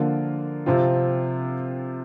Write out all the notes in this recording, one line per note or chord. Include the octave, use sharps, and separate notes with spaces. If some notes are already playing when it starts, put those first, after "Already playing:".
Already playing: D3 F3 A#3 F4
C3 F3 C4 F4